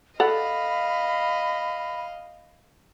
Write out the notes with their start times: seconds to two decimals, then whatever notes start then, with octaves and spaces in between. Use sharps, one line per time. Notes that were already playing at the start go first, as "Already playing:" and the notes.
0.20 A4 D5 D#5 F5 F#5 B5